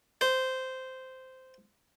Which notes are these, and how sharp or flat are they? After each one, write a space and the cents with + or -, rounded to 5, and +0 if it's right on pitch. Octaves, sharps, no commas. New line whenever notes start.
C5 -10